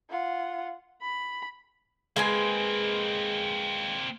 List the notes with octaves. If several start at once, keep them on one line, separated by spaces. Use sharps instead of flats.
F4 F#5
B5
G#3 A#3 C4 B4 G#5